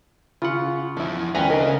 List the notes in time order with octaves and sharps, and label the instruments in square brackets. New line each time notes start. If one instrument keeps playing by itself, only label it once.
[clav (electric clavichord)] C#3 F#5 [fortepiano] F4
[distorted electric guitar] E2 [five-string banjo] F3 E4
[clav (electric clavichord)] D2 B4 A#5 [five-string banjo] D#3 E3 G#3 [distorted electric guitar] C#4
[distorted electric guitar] C#3 C#4 [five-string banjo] D4 A#4 D#5